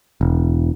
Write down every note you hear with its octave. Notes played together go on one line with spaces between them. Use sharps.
E1